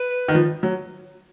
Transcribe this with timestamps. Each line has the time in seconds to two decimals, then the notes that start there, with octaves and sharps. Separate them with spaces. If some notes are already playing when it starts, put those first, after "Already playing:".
Already playing: B4
0.28 D#3
0.35 F3
0.63 F#3